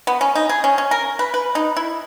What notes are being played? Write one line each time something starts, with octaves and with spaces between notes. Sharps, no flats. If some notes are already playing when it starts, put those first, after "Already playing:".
B3
C#4
D#4
G#4
C#4
C#4
A#4
B4
B4
D#4
E4